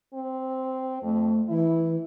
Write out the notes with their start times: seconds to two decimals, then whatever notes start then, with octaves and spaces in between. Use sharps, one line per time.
0.14 C4
1.02 F2 A3
1.48 E3 E4